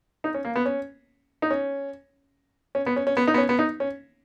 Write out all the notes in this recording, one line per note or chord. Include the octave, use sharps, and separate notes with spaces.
D#4
C#4
A#3
B3
C#4
D#4
C#4
C#4
B3
C#4
C#4
B3
D#4
B3
C#4
B3
D#4
C#4